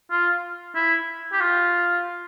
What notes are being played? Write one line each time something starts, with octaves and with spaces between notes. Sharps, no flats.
F4
E4
G4
F4